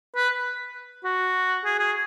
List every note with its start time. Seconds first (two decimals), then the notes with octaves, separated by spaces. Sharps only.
0.15 B4
1.04 F#4
1.64 G#4
1.79 G#4